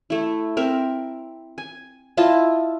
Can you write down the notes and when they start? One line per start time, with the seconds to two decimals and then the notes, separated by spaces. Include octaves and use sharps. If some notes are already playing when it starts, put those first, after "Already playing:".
0.10 A3 E4
0.57 C4 A#4 E5
1.58 G#5
2.17 E4 F4 D#5 A5